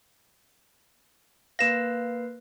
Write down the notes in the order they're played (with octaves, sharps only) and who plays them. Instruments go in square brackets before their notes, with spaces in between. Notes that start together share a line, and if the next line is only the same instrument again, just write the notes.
[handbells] A#3 B4 F5 [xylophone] A#6 E7